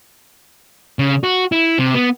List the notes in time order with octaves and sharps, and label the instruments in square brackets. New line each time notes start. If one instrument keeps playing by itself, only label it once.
[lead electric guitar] C#3
F#4
E4
C3
B3